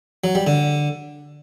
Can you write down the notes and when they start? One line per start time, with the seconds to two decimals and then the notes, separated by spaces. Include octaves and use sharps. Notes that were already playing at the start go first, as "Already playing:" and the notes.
0.24 F#3
0.35 G3
0.47 D3